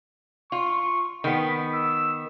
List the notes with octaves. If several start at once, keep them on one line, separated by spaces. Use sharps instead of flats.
F4 C#6
D#3 B3 B5
E6